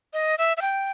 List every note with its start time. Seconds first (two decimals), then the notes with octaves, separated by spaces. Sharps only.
0.13 D#5
0.38 E5
0.57 E5
0.62 G5